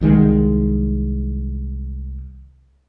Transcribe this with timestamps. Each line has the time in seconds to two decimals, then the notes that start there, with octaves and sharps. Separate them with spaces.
0.01 C2 D#3 G#3